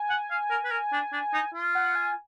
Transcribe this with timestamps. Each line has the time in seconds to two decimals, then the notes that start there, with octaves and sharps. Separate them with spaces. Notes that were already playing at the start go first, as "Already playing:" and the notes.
Already playing: G#5
0.10 F#5
0.30 F5
0.50 A#4
0.65 B4
0.71 A#4
0.93 D4
1.13 D4
1.34 D#4
1.54 F4
1.75 F#5
1.95 G#5